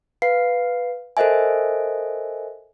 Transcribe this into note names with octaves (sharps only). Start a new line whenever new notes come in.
B4 F5 C7
A4 A#4 C5 D#5 E5 G#5